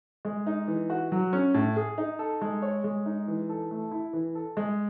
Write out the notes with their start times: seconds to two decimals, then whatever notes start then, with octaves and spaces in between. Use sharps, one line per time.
0.25 G#3
0.47 D#4
0.68 E3
0.90 F#4
1.12 F#3
1.33 C#4
1.54 A2
1.76 G#4
1.98 D#4
2.19 A4
2.41 G#3
2.62 C#5
2.84 G#3
3.06 D#4
3.28 E3
3.49 A4
3.71 A3
3.91 E4
4.13 E3
4.35 A4
4.57 G#3